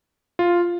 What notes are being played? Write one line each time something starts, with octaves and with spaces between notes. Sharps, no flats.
F4